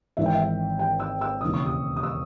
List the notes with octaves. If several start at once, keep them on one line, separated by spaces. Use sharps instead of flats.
G#1 G#2 E3 E5
G5
E5
G5
E6
E6
E1 D#2 C#3 E3 D#6
C#6
D#6
D#6
E6